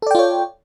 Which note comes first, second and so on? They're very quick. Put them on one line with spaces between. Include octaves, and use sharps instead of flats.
A4 D5 G5 F4 C#5